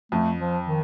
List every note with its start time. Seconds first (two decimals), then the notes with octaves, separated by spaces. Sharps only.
0.12 F2 A3
0.39 F3
0.68 D#3